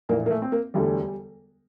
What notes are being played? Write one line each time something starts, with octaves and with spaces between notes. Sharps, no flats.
A#1 A2 E3 A#3
A#3
A3
C4
A#3
E1 D2 D3 G3